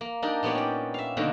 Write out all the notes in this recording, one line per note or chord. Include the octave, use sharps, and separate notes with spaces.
A#3
D4 D#4 G4 A#4 D5
A#2 B3 G4 C#5 D5
C#4 D5
E5 F5
B2 D3 D#3 A#3